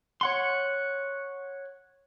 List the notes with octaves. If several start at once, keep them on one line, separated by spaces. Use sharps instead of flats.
C#5 F#5 C6